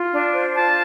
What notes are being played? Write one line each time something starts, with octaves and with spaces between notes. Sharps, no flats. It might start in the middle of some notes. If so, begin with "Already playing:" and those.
Already playing: F4
D4
C5
F4 A5